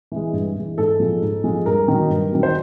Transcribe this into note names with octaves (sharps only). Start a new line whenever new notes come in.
E3 G#3
G2
E3 G#3
G#2 A4
F3 G#3
G#2
F3 G#3
G2 A#4
D#3 F#3
G2
D#3 F#3
C5